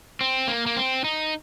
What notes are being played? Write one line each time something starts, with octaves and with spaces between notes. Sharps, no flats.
C4
A#3
A#3
C4
D#4